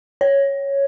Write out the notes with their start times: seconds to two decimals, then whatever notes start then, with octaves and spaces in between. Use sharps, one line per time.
0.21 C#5